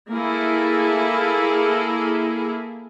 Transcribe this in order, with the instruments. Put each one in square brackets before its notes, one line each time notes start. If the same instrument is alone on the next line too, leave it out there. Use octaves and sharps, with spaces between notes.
[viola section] A#3 E4 G#4 A4